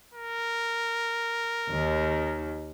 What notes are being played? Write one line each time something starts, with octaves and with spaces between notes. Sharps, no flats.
A#4
D#2 D#3